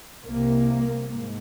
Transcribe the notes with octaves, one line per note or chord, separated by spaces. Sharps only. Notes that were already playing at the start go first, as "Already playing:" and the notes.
C2 C3 A#3
G#2